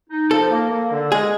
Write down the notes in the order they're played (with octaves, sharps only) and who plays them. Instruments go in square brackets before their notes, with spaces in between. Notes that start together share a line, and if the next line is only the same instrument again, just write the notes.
[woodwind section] D#4
[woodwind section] F3 [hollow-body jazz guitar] A4
[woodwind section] A#3
A#3
D3
[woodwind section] G#3 [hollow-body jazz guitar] G#4